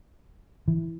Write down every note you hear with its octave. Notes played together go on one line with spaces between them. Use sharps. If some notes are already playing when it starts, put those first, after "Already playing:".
E3